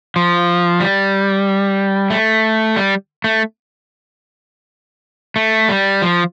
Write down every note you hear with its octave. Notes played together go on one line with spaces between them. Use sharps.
F3
G3
A3
G3
A3
A3
G3
F3